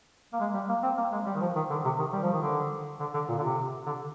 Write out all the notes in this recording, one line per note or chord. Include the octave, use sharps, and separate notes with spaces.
A#3
G#3
G3
A#3
C4
A#3
G#3
G3
D#3
F3
D#3
D3
C3
D#3
G3
F3
D#3
D3
D3
D3
A#2
D3
C3
D3